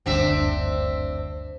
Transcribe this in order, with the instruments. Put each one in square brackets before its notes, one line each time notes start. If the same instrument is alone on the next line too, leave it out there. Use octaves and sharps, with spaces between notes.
[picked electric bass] F#1 D2 G2 [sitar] C4 D4 E5